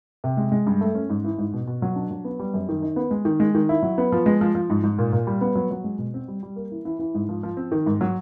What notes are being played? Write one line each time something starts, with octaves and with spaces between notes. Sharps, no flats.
C3
G#3
G#3
G2
A3
C#4
G#2
E3
G#2
B2
B2
F#3
D4
F#3
B3
G3
F#2
D#3
D#4
B3
G#3
D#3
G#3
D#3
E4
F#3
B3
F3
G#3
F3
F3
G#2
G#2
A#2
A#2
G3
B3
F#3
F#3
G#3
B2
C4
G3
G3
A#3
E3
E3
E3
G#2
F3
F3
C4
D#3
G#2
F#3